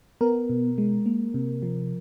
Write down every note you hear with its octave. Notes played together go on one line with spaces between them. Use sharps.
B3 A#4
B2
G#3
A#3
C3
F3